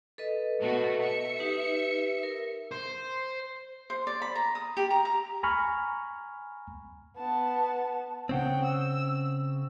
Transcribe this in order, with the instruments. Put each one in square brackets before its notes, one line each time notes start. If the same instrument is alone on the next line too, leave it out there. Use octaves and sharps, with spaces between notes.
[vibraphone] A4 B4 D#5
[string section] B2 A3 F#4
E5 C#7
[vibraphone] D#4 G4 B4
A#4
[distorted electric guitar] C5
[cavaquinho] C5
D5
B5
A#5
D#6
G4
A#5
A#5
[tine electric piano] G#5 A#5 B5 C#6 F6
[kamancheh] B3 A5
[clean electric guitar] C#3 C4 [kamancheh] F#5 G5
[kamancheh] E6